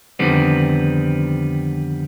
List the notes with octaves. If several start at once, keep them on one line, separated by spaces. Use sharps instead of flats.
F2 D3 D#3 G3 B3 C4